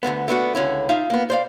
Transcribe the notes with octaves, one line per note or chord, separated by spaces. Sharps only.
D2 G#2 D3 B3
A3 B3 D4 F#4
C#2 D3 C#4 E4
D#4 F4 E5 F5
A#3 B3
C5 D5 F5